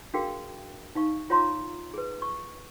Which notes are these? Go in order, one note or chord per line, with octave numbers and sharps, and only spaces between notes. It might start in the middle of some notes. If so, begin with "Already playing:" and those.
D4 F#4 G#4 A#4 F5 G5
D#4 F5 C#6
F4 C#5 F5 A#5 C6
G#4 B4
C#6